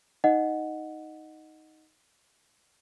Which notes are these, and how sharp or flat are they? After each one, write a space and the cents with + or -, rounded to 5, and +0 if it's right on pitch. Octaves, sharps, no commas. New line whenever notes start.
D#4 +10 D#5 -10 F#5 -10